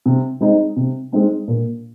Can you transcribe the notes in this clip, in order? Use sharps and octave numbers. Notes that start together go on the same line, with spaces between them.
C3
G#3 C4 D#4
C3
G#3 C4 D#4
A#2